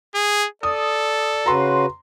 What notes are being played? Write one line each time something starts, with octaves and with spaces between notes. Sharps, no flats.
G#4
A4 D5 D#6
C#3 F#4 B4 A#5 C6